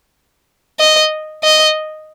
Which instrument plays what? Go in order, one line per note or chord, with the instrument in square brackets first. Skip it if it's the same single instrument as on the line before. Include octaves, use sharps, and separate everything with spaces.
[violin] D#5
D#5